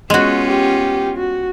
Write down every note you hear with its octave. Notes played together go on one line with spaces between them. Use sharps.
G#3 B3 C#4 F4 F#4
G4
F#4